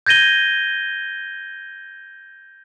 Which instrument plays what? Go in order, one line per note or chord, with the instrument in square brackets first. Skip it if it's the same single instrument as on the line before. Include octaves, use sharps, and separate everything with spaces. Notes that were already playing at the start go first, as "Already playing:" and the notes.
[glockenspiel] G6 G#6 A#6 D#7 G7